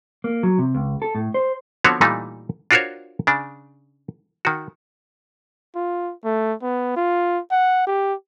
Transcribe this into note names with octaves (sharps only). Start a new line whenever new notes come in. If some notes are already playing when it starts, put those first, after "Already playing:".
A#3
F#3
C3
C#2
A4
A2
C5
D3 F3 B3 C4 F#4 C#5
A#2 E3 G3 A3 D#4
D4 F4 F#4 A#4 C5 C#5
C#3 D4
D#3 F#4
F4
A3
B3
F4
F#5
G4